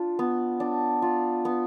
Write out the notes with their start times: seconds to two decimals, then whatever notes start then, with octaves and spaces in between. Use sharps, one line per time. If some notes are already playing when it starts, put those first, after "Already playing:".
Already playing: D4 F4
0.19 B3
0.60 D4
1.02 F4
1.45 B3